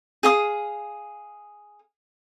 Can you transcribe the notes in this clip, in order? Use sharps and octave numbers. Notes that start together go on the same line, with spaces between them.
G#4 F5 D#6